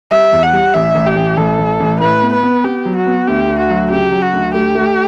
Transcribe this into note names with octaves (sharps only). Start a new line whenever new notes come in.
G3 E5
E2
F#5
G3
A1 E5
A1
G4
A1
A1 A4
A1
A1
A2 B4
B3
B4
B3
B3 G4
F#3
F#4
B3
D2 G4
D2
F#4
F#3
C#3 G4
F#3
F#4
D2
A3 G4
A3